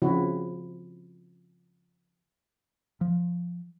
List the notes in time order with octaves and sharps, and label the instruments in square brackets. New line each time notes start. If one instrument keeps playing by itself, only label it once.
[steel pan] C#3 F3 C4 E4 F#4
[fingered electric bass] F3